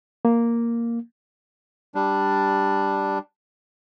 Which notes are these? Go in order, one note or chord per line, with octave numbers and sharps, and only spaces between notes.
A#3
G3 D4